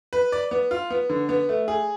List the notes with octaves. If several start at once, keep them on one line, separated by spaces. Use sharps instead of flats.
B4
D5
B3
F4
B3
D3
B3
A3
G#4